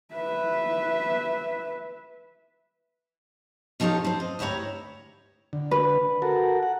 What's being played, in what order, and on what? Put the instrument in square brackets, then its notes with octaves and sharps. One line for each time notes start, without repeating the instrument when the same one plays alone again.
[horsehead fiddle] B4 E5
[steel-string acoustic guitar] B2 F3 D#4 G4 A4 C#5
C4 C5
D#5
D2 E4 G4 C#5 A#5
[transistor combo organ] D3
[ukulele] B4
[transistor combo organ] F#4 A4 A#4
F#5